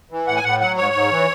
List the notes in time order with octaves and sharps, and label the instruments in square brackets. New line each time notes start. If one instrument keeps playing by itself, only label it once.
[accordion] E3
A2 F#5
G#5
A2 F#5
F#3 F#5
G#2 C#5
G#2
E3